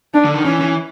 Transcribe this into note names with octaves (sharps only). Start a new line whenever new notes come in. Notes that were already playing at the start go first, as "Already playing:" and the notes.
D4
D3
D#3
E3 C#4
E3